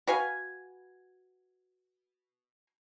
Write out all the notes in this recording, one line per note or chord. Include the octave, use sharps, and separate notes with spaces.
F#4 B4 F5 G#5